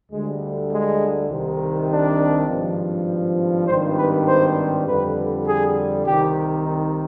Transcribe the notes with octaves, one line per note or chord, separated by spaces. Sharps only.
D2 D3 G3 G#3
G#3
C2 C3 D#3
D4
G#1 G2 F3
G#1 G2 D#3 G3 C5
B4
C5
F2 D3 G3 B4
G#4
C2 C3 D#3 G4
D#4